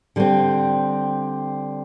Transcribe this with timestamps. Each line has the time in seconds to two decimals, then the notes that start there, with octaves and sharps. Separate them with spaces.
0.16 D3 G3 C4